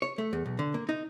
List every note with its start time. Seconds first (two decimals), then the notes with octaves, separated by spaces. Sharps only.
0.02 C#5
0.18 A3
0.33 E2
0.46 B1
0.59 D3
0.74 A#3
0.89 D#4